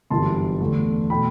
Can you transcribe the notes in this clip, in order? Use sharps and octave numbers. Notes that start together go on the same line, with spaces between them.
G1 F#2 E3 G3 A5 C6
E2 D3 A3
B2 A3 G5 B5